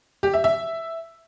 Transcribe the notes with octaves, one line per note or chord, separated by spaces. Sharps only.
G4
E5
E5